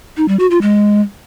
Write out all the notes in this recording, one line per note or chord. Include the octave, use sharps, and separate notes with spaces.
D#4
G3
F#4
F4
G#3